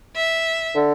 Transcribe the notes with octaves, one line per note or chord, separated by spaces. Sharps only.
E5
D3